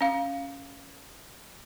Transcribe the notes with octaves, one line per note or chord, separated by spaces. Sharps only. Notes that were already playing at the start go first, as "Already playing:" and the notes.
C#4 F5